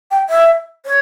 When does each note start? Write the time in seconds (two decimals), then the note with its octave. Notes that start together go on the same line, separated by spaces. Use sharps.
0.11 G5
0.29 E5
0.86 C#5